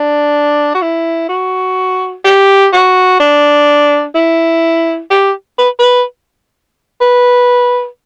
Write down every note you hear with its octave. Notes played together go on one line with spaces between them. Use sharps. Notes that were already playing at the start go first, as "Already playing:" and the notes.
Already playing: D4
F#4
E4
F#4
G4
F#4
D4
E4
G4
B4
B4
B4